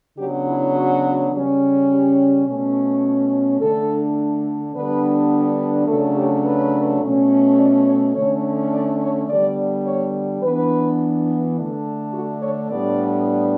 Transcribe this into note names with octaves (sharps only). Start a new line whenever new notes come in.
C#3 F#3 B3 D4 G4
E4
F#4
C#3 G3 C#4
G4
B2 A3 C#4
D3 A3 D4 A4
D3 G3 B3 D4 B4
C#3 F#3 A3 D4 A4
G4
B4
B2 A3 C#4
D5
C#5
D3 A3 C#4 C#5
D5
C#5
D3 G3 B3 D5
C#5
E3 B3 D4 B4
D3 A3 D4
F#4
C#5
A2 G3 B3 D4 D5